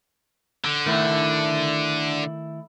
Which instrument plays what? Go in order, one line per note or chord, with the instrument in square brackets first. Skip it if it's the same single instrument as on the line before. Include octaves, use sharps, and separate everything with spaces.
[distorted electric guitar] D3
[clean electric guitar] D#3 A3 E4